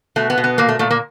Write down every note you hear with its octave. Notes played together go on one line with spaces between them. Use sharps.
B2 A3
B3
B2
B3
A#2 A#3
A3
A#2 A3
A#3